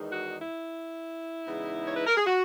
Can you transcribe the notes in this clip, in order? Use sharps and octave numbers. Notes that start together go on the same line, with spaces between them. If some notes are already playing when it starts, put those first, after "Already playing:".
Already playing: E2 D#3 G#3 D#4
F#4
E4
E2 C#3 G#3 B3 D#4
C#5
B4
A#4
G#4
F#4